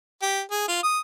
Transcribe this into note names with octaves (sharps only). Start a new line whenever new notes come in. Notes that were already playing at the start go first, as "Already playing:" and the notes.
G4
G#4
F4
D#6